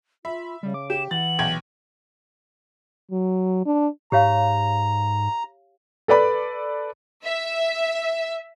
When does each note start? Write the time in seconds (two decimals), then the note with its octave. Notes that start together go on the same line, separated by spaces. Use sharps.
0.25 F4 E5 B5
0.63 C#3 G3
0.74 D6
0.90 G4 E7
1.11 E3 F#5 A6 F#7
1.39 B1 G5 G#6
3.11 F#3
3.66 D4
4.12 G#2 G4 C#5 F5 A#5
6.08 A4 B4 D5 B5
7.24 E5